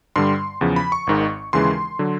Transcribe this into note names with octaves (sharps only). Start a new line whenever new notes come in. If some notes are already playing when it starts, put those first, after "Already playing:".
G2 D3 G3 C6
E2 C#3 F3
B5
C#6
G#1 G#2 D#3
D#2 C#3 E3 G#3 C6
D3 F#3